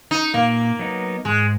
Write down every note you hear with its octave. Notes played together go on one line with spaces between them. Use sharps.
D#4
A#2 A#3
F#3 B3 D#4
G#2 G#3